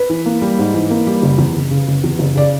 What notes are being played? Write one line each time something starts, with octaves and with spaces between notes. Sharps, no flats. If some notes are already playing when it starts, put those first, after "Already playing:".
Already playing: B4
E3
A#3
G3
G#2
E3
A#3
G3
F#1
E2
F#1
C#3
F#1
E2
F#1
C#3 D5